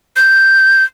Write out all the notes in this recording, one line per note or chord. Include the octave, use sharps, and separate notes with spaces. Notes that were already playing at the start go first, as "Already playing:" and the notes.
G6